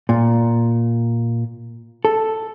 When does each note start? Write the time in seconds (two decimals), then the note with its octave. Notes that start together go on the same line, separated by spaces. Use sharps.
0.09 A#2
2.05 A4